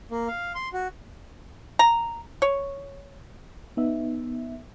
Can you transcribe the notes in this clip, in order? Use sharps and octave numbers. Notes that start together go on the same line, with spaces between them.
A#3
F5
C6
F#4
A#5
C#5
B3 D#4 E5